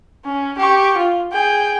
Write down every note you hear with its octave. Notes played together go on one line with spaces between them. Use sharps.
C#4
G4 C#6
F4
G#4 G5